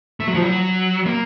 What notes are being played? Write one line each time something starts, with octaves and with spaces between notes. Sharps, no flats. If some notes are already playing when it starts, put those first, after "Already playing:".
A3
F#3
F3
F#3
A#3